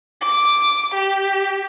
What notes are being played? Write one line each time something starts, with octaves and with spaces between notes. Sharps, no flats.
D6
G4